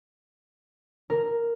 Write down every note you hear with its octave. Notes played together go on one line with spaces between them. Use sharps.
A#4